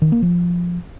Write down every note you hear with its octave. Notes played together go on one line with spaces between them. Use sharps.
D#3
A#3
F3